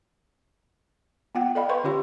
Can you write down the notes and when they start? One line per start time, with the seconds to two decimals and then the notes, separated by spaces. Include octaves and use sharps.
1.35 B3 F4 F#5 G5
1.55 A4 D5 D#5 F5 G5 B5
1.69 B4 C5 F5 C6 C#6
1.84 D3 C#4 F4 G4 C#5 C6